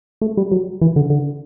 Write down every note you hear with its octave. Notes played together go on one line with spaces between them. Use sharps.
A3
G3
F#3
E3
D3
D3